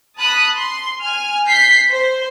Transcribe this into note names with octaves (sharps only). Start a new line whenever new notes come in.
A5 B5 D#6 F#6
C6
G#5 F6
G6 B6 C7
C5